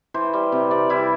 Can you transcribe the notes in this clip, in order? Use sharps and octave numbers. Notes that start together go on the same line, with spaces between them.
E3 C5
G3
C3
C3 D5
G3 E4